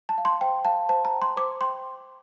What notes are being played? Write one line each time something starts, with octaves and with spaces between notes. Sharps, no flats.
A5
F5
C6
C5 G5
F5 A5
C5 A5
A#5
G5
C6
C5 D6
G5 C6